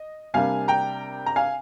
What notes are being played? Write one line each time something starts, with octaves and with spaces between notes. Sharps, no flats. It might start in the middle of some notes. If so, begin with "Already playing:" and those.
Already playing: D#5
C3 G3 A#3 D4 F5 G#5
G5 A#5
A#5
F5 G#5